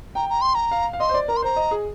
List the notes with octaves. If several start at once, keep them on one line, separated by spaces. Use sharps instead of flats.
G5 A#5
A#5
C6
A#5
F5
F5
D#5 C6
C5
D5
A#4 A#5
C6
C5 A#5
D#5
G#4